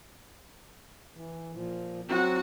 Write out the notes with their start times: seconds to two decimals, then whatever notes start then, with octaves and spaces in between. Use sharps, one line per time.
1.14 E3
1.52 A#2 F3
2.09 F#3 C4 F#4 F#5